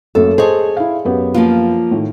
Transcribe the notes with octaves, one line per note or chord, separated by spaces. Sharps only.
F#2 A3 A#3 A4
G#4 C5 C#5 D#5 A5
E4 F5
F#2 B3 G4
F3 A#3 F4
A2 D#3